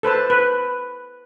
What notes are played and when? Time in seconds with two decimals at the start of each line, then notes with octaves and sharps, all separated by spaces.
0.03 A4 B4 C5 A5
0.30 B4